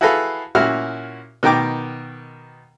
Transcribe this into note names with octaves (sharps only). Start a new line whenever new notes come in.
E4 F#4 G#4 A4 B4 F5
A#2 C#4 E4 F#4 F6
B2 D#3 A#4 G5 D6